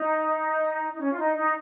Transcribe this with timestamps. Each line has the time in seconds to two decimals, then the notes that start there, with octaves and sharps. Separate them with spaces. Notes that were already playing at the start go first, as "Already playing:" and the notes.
Already playing: D#4
0.94 D#4
1.01 C#4
1.12 F4
1.19 D#4
1.36 D#4